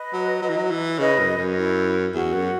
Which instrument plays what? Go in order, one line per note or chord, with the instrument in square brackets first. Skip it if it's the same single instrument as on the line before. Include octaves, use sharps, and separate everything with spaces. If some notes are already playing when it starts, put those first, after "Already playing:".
Already playing: [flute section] B4 D#5
[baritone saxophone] F#3
F#3
E3
F#3
E3
[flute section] C#5
[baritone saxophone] C#3 [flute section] B4 D#5
[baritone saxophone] F#2
F#2
[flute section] E4
[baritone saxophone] E2 [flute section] F#4
[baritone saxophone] F#2